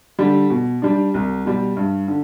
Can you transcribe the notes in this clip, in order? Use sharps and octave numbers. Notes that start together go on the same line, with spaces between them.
D3 G3
B2
G3 D4
C2
B2 G3
G2
D3